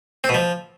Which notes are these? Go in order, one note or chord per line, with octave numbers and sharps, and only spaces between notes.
C4
B2
F3